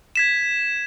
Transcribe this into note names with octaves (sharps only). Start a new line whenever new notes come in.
G#6 B6 E7